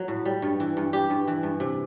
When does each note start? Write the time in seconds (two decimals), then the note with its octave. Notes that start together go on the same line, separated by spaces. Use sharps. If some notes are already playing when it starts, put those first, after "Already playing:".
Already playing: F#3
0.08 A2
0.25 G3
0.42 G2
0.60 E3
0.77 G2
0.93 G3 G4
1.10 G2
1.27 E3
1.43 G2
1.60 C3